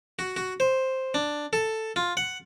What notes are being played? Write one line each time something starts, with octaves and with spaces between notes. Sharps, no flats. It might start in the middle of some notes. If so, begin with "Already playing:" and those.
F#4
F#4
C5
D4
A4
F4
F#5